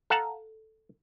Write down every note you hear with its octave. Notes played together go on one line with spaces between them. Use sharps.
A4 F5 F#5 A5 A#5